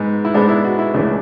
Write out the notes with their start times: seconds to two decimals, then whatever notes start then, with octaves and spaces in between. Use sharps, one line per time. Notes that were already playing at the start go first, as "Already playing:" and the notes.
Already playing: G#2 G#3 B3
0.25 E4
0.34 G#2 G#3 B3 D4
0.49 E4
0.64 F#4
0.79 E4
0.94 C#2 C#3 E3 A3 D4